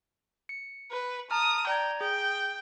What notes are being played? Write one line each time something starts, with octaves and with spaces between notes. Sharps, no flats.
C#7
B4
A5 A#5 D#6 F6
D5 G5 A#5 G#6
G#4 G5